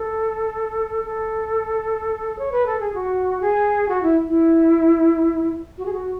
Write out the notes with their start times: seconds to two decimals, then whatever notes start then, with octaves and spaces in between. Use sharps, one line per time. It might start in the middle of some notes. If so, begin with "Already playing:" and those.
Already playing: A4
1.05 A4
2.39 C#5
2.52 B4
2.66 A4
2.80 G#4
2.94 F#4
3.41 G#4
3.89 F#4
4.03 E4
4.29 E4
5.78 F#4
5.86 G#4
5.93 F#4